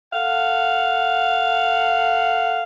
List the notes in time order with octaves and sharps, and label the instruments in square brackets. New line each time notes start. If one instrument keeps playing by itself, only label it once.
[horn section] A4 F5 F#5